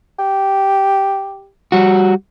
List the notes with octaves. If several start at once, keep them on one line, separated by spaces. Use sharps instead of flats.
G4
G3 F#4